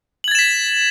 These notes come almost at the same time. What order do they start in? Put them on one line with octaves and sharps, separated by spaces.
F#7 G#6 A6 E7 B6